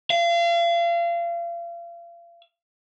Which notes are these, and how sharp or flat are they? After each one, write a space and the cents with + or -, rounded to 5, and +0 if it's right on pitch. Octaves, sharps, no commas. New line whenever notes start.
F5 -35